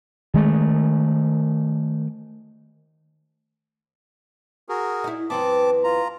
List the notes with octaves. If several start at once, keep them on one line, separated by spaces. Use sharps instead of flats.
D#3 G#3 A3
F#4 G#4 A#4
D#4 E4
F#2 E3 B3 C4 A5 D6
F4 A#5